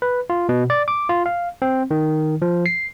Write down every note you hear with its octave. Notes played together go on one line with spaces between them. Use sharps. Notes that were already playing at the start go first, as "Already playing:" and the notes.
B4
F4
B2
D5
D6
F4
F5
C4
D#3
F3
C7